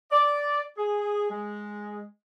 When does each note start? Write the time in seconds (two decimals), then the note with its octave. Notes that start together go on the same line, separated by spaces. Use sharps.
0.11 D5
0.77 G#4
1.30 G#3